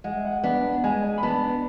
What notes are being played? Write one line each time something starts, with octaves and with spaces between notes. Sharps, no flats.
G#3 F#5
E5
F#5
B3 D4 F#5
G#3 G#5
B5
B3 D4 A5